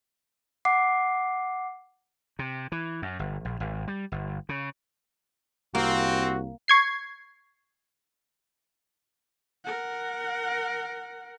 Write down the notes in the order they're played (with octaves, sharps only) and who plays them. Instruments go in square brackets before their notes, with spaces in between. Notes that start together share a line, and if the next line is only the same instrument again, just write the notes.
[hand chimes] F#5 D6 C7
[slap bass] C3
E3
F#2
G1
A#1
G#1
G3
G1
C#3
[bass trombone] C2 [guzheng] A#3 [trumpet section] C4 [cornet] F#4
[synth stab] C#6 G#6 C7
[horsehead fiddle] A#4 F#5